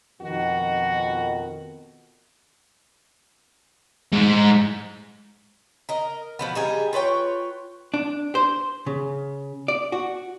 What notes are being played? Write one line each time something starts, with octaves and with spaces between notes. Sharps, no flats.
F2 B2 D#3 F#4
G#2
A#4 D#5
B2 F3 B3
G3 D#4 G#4
F4 B4 C#5 G5
D4
C5
C#3
D5
F#4